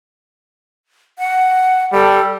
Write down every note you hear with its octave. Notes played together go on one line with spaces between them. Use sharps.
F#5
G3 A4